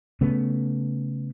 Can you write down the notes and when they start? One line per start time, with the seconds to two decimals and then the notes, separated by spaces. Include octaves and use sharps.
0.21 C#3 A3 B3